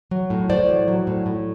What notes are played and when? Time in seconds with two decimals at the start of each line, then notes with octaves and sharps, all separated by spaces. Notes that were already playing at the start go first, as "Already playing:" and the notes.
0.11 F#3
0.30 A2
0.50 A2 C5 D5
0.69 F#3
0.88 F#3
1.07 A2
1.26 A2